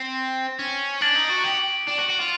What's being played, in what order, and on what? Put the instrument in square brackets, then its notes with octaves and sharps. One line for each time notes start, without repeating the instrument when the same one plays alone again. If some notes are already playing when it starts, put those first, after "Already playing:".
Already playing: [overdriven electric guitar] C4
C#4
[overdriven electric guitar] D4 [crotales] A6 D7 F#7
[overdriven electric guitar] D#4
F#4
G4
D4
F#4
F#4
F4